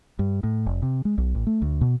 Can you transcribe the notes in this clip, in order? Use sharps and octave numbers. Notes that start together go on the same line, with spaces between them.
G2
A2
F1
C3
G#3
B1
A1
A3
D2
B2